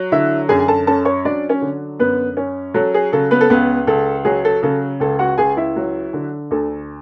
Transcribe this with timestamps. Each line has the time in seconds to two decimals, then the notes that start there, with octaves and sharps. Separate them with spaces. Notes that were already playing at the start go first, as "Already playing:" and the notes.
Already playing: F#3
0.12 D3 E4 E5
0.49 F#2 G#4 G#5
0.59 G#5
0.68 A4 A5
0.87 C#4 A4 A5
1.05 C#5 C#6
1.25 F#3 D4 D5
1.49 C#4 C#5
1.62 D3
1.99 F#2 B3 B4
2.37 C#4
2.74 F#3 A4
2.94 G#4
3.13 C#3 A4
3.31 B3 B4
3.41 A4
3.50 C#2 B3 B4
3.87 C#2 A4
4.25 F#3 G#4
4.45 A4
4.63 C#3 A4
5.00 C#2 A4
5.19 F#4 F#5
5.38 C#2 G#4 G#5
5.57 E4 E5
5.76 F#3
6.13 D3
6.51 D2 A4